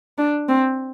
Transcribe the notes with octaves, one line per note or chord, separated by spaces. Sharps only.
D4
C4